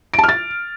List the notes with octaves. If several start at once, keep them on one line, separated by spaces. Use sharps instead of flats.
D7
A5
F6
A6